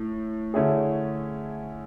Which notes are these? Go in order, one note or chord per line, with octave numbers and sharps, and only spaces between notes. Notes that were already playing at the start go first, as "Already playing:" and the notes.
Already playing: A2
D3 A3 C#4 E4 G#4